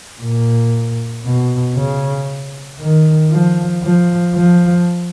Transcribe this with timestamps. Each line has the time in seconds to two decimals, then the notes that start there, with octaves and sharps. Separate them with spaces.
0.21 A#2
1.25 B2
1.76 C#3
2.79 D#3
3.31 F3
3.83 F3
4.35 F3